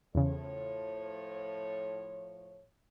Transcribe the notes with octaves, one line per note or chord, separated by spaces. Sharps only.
E2 A2 C#3 F3 C#5